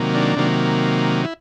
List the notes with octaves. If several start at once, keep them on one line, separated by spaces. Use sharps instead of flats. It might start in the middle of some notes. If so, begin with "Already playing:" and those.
Already playing: C3 D#3 F#3 A#3
D4
C3 D#3 F#3 A#3
E4